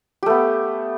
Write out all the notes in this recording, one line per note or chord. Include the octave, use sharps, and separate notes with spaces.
A3 B3 G4